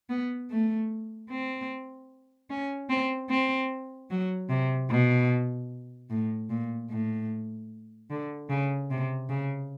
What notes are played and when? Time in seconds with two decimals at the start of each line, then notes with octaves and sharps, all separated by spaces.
0.09 B3
0.51 A3
1.30 C4
2.50 C#4
2.89 C4
3.30 C4
4.10 F#3
4.49 C3
4.91 B2
6.10 A2
6.50 A#2
6.90 A2
8.10 D3
8.49 C#3
8.90 C3
9.29 C#3